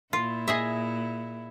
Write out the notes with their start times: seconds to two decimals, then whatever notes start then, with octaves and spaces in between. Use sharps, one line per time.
0.13 A#2 E4 F4
0.48 G#4 D#5 E5